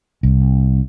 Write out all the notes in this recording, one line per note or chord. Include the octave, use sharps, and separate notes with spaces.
C2